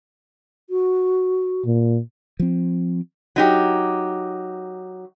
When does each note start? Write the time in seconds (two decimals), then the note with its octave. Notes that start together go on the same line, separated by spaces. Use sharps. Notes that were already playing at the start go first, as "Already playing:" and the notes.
0.70 F#4
1.66 A#2
2.40 F3 C4
3.36 F#3 D#4 G4